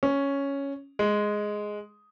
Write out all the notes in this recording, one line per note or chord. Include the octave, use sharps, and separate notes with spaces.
C#4
G#3